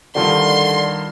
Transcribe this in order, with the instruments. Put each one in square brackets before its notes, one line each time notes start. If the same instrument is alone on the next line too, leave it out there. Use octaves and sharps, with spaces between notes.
[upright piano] G2 D#3 F3 [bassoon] D3 [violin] C6